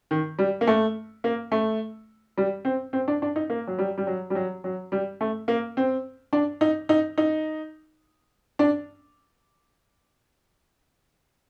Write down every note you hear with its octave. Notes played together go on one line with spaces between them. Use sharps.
D#3
G3
A#3
A3
A#3
A3
G3
C4
C4
D4
D4
D#4
A#3
F#3
G3
G3
F#3
G3
F#3
F#3
G3
A3
A#3
C4
D4
D#4
D#4
D#4
D4